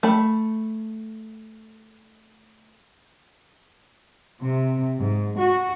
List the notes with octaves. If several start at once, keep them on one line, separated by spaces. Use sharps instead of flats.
A3 B5
C3
G#2
F#4